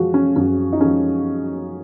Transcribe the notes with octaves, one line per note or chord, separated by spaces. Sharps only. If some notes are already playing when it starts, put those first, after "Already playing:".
Already playing: F#2 F3 G#3 F#4
C#4
F#2 C#4
D#4
F3 G#3 C#4